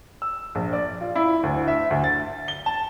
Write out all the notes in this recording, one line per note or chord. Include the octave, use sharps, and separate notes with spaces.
E6
A#1
D5
F4
E4
D2
E5
D2
A6
G7
A5